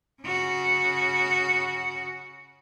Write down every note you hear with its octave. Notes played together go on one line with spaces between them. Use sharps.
C#3 F#4